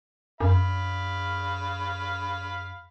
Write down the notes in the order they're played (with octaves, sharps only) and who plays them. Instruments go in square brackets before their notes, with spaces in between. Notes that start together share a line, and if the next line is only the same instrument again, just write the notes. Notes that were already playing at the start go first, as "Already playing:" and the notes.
[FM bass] F#2 [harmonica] F5 B5